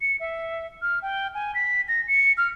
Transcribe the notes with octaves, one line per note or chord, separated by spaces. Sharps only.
C#7
E5
F6
G5
G#5
B6
A#6
C#7
F6